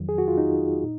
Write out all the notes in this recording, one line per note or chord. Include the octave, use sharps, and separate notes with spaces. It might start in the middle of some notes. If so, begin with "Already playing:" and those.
Already playing: F2 D#3 F#3
G#4
F#4
F4
D#4
A#2